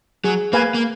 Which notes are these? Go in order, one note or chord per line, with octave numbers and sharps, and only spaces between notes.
F#3 G#4
A#3 B4 F5 G#5
A#3